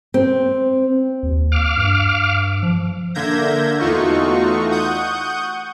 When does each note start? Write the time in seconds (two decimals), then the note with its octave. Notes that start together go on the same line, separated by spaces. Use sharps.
0.14 C4
1.23 D#2
1.52 F5 D6 F6
1.77 G2
2.63 F3
3.15 D3 A#3 E5 G6 G#6 A#6
3.79 E2 A3 D#4 F4 F#4 C#6
4.71 F#5 C#6 D#6 G6